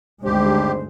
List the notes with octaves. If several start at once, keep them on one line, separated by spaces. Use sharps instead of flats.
G#1 D2 G2 G#3 D4 G4 C5